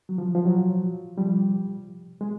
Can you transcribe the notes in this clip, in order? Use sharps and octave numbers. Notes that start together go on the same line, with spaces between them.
F#3
F3
F3
F#3
F3 G3
G#3